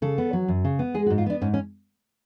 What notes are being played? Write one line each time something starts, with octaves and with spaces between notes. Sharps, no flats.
C#3 A4
B3
F#3
F#2
C#3
B3
G#3 G#4
F#4
G#2
F4
B3 D4
G#2 C#4
C#4